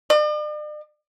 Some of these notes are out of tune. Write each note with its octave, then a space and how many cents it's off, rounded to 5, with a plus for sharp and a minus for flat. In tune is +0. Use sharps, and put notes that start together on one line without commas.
D5 +45